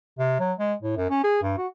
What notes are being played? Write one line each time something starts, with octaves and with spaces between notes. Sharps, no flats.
C3
F#3
G#3
A2
F#2
C#4
G#4
G2
F#4